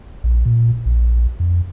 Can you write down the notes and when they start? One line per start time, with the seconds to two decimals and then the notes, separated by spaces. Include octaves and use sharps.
0.24 A#1
0.46 A#2
0.86 A#1
1.40 F2